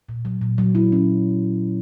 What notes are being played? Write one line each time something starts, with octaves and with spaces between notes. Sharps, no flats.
A#2
F#3
A#2
F#3
E4
C#4